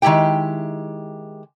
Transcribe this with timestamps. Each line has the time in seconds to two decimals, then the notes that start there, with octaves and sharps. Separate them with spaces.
0.02 D#3 G#3 B3 E4 G4 G5